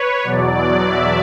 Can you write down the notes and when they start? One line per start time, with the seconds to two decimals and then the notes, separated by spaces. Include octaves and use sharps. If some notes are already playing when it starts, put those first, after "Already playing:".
Already playing: B4 C#5
0.24 E2 B2 F#3 D5
0.55 D5
0.87 E5